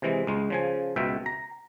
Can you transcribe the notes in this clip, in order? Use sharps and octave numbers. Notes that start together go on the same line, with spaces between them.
C3 E3 G#3
C#2 G#3
C#3 F3 G#5
C#2 B2 E5 G5
A#5